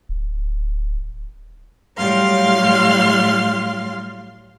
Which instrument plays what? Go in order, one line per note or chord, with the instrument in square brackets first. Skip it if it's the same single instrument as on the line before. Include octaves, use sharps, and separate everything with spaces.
[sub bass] D1
[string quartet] A2 F#3 G3 F5 C6 F6